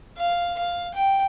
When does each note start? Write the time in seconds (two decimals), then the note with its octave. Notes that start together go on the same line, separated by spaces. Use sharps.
0.18 F5
0.58 F5
0.94 G5